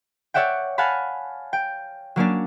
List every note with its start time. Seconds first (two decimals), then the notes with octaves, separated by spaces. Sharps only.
0.34 C#5 D5 E5 F#5 G5
0.78 F5 F#5 G#5 A5 B5
1.53 G5
2.16 F#3 A#3 C#4 D4